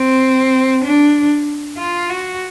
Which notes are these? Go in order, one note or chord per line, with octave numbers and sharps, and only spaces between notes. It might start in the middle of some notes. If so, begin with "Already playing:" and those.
Already playing: C4
D4
F4
F#4